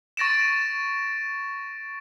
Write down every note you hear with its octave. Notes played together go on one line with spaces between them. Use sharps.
C#6 A6 A#6 D7 E7
A6